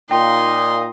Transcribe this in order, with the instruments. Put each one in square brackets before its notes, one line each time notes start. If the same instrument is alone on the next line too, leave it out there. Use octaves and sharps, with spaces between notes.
[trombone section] A#2 [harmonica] D#4 A#5 D#6 [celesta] G5 [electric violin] C6